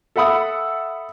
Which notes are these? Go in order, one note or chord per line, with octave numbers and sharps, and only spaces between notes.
A4 E5 F#5 B5 D#6